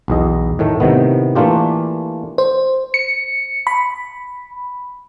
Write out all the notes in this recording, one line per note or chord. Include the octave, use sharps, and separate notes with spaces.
B1 E2 D#5
A2 D#3 A3
A2 C3 D#3 B3
E3 A3 A#3 D4 F4 G4
C5
C#7
B5